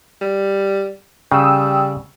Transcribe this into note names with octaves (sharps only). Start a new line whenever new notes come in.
G3
C#3 G3 G5 D#6 E6